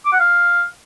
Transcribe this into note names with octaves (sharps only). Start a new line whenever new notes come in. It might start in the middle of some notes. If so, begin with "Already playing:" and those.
D6
F#5
F5